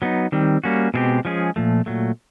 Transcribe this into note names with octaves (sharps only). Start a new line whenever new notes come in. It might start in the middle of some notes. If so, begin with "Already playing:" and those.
F#3 B3 D#4
D#3 G3 C4
G3 A#3 C#4 F#4
B2 G#3 C4 E4 G4
F3 G#3 C#4 F4 G#4
A#2 F3 A3
A#2 F#3 A3